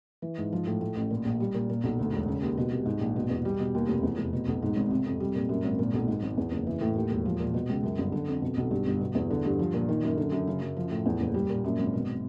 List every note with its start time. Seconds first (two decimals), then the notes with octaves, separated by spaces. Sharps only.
0.22 E3
0.38 G#2
0.53 F3
0.67 A2
0.81 A2
0.96 A1
1.10 A#2
1.25 A#1
1.40 G3
1.54 A#2
1.70 A#2
1.84 B1
1.99 D2
2.13 E1
2.28 C#3
2.42 D#2
2.57 B2
2.71 C2
2.86 G#2
3.01 A#1
3.16 B2
3.30 E2
3.45 G3
3.60 B2
3.75 D#2
3.89 F1
4.03 E2
4.18 F1
4.33 B2
4.48 B1
4.62 G#2
4.76 G#1
4.91 C3
5.06 F2
5.20 G3
5.35 A#2
5.49 F#2
5.64 G#1
5.79 A#2
5.94 B1
6.08 G#2
6.22 G#1
6.37 E2
6.52 F#1
6.67 E3
6.81 A2
6.95 D#2
7.11 E1
7.25 F3
7.39 A#2
7.54 B2
7.69 C#2
7.83 F#2
7.98 G1
8.12 D3
8.28 F2
8.42 B2
8.57 B1
8.71 G2
8.87 G1
9.01 B2
9.15 E2
9.30 D3
9.45 G2
9.59 F3
9.74 A#2
9.89 D#3
10.03 F#2
10.17 D3
10.32 F#2
10.48 C#3
10.62 F#2
10.77 F3
10.91 A2
11.06 E2
11.20 F#1
11.34 G3
11.50 A#2
11.64 F#2
11.79 G#1
11.94 B2